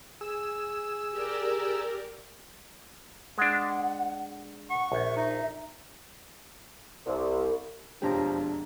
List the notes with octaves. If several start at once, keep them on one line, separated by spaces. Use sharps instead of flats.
G#4 E6
G4 A#4 D5
G#3 D4 F#5
F#5 C#6
A#1 E5
D#4
C2
E1 F2 F3 D4 G4 C#5 G5 A#5